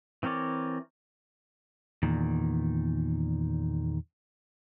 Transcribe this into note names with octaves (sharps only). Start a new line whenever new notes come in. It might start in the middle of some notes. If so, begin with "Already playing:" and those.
E3 C4 A#4 C#5 D5
E2 A#2 D#3